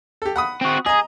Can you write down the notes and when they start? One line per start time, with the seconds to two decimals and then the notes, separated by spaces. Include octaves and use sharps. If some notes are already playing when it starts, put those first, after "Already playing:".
0.22 G4 A4
0.36 F#5 B5 D#6
0.61 C4 F#4
0.86 G#4 D#5 A#5